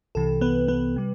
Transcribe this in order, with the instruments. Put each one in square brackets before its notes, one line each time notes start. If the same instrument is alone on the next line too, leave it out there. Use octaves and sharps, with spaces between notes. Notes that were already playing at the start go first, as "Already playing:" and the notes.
[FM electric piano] C2 C3 E3 A4
B3 B4
B3 B4
C3 G3